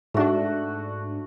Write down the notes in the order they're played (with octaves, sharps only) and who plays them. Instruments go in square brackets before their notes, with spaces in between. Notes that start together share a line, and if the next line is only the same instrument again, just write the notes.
[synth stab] G#2 D4 [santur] A3 F#4